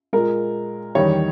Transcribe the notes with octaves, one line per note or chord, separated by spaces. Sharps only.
A#2 G#3 A#4
E2 D#3 G3 C#5